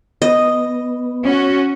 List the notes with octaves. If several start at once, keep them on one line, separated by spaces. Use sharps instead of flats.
B3 D#5
C#4 F#4